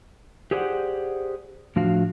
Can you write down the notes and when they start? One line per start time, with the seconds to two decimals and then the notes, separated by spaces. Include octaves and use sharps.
0.51 G4 G#4 C5 D5 E5 F#5
1.76 A2 F3 D4 F#4 F5